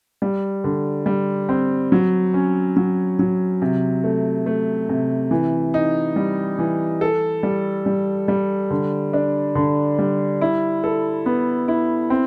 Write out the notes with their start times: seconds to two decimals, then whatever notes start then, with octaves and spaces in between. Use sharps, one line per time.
0.22 G3
0.64 D3
1.06 G3
1.49 C4
1.92 F#3
2.34 C#4
2.77 F#3
3.19 F#3
3.62 C3
4.04 A3
4.46 A3
4.89 C3
5.31 E3
5.74 D#4
6.16 G3
6.59 E3
7.01 A4
7.43 G3
7.86 G3
8.28 G3
8.71 D3
9.13 D4
9.55 D3
9.99 G3
10.41 E4
10.84 A4
11.26 B3
11.68 E4
12.10 C4